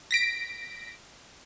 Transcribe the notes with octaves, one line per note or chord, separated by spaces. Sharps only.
A#6 B6 D7